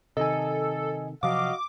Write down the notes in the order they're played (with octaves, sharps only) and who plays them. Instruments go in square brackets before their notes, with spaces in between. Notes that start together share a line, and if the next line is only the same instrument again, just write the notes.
[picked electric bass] C3 D#3 [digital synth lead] A4 [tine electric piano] D#5 G#5
[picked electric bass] C3 F3 F#3 [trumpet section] F#4 D#5 F5 [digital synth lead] D6